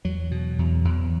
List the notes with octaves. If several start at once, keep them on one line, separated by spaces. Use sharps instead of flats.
E2 F#3
B2
E2
E2